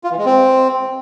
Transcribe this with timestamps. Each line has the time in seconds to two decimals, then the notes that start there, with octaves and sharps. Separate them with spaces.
0.04 F4
0.11 E3
0.18 G#3
0.25 C4